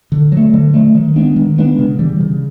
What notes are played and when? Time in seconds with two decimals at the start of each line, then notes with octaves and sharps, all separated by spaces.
0.12 D3
0.32 F#3
0.37 A3
0.54 D3
0.74 F#3 A3
0.95 D#3
1.16 G#3 B3 D4
1.36 D#3
1.58 G#3 B3 D4
1.79 C#3
1.99 E3 G3
2.20 C#3